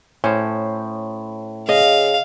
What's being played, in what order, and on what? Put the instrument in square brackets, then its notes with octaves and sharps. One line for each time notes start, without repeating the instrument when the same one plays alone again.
[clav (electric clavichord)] A2 C5 [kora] C#4
[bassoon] C#3 [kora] D#5 [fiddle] F5